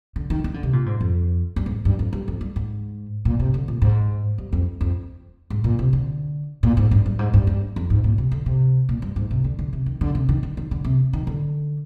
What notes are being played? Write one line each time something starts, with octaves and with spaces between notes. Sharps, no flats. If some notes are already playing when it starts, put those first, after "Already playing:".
D3
D#3
D#3
D3
C3
A#2
G#2
F2
G2
G#2
G2
F2
G2
F2
G2
G#2
A#2
C3
D3
A#2
G#2
G2
F2
F2
G#2
A#2
C3
D3
A#2
G#2
G2
G2
G#2
G2
G2
F2
G#2
A#2
C3
D3
C3
A#2
G2
G#2
C3
D3
D3
C3
D#3
D3
C3
D#3
D3
D#3
D3
C3
D#3
D3